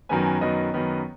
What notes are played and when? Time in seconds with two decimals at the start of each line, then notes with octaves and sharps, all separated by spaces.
0.09 F#2 D#3 B3 G#5
0.26 G#5
0.41 F#2 D#3 B3 D#5
0.74 F#2 D#3 B3